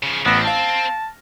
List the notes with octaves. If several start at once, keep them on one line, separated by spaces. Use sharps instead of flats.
C#3 F3
A1 B3 C4 A#6
F5 A5 F6